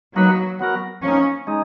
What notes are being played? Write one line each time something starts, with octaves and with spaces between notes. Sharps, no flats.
F#3 A#3 D#4 F#4 B4
F#3 B3 F#4 A#4
F3 A#3 C#4 D#4
G#3 D#4